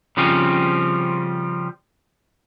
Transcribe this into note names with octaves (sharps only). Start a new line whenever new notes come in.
C#3 F3 G3 C4 C#4